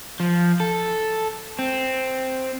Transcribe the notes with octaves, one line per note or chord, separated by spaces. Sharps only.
F3
A4
C4